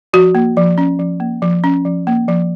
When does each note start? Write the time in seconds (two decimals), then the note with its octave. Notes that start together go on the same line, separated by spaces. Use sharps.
0.13 F3 F#4
0.35 A#3
0.57 F3
0.78 C#4
0.99 F3
1.20 A#3
1.42 F3
1.64 C#4
1.85 F3
2.07 A#3
2.28 F3